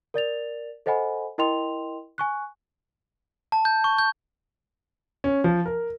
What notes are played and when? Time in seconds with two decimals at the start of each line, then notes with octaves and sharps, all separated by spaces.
0.14 A#4 D5 A6 F7
0.86 A4 C5 D#5 F#5 G#5 B5
1.38 E4 A#4 D#5 G5 C6 F7
2.18 G#5 C#6 F#6
3.52 A5
3.65 G6
3.84 C#6
3.98 G6
5.24 C#4
5.44 F3
5.66 A#4